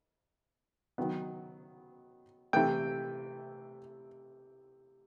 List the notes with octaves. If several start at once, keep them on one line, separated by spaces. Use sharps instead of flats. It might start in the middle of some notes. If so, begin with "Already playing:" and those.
D#3 F#3 B3
C3 E3 A3 G5